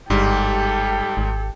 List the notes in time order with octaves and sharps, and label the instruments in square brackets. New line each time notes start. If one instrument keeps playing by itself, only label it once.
[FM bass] G1 [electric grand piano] G#2 G3 [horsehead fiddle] G4 A4
[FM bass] G#1